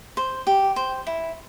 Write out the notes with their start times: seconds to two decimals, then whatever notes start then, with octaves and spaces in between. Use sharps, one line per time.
0.17 C5
0.47 G4
0.76 C5
1.07 E4